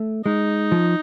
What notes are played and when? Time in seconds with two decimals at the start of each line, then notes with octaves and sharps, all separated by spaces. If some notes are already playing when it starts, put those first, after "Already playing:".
Already playing: A3
0.25 G#3 D#4
0.72 F3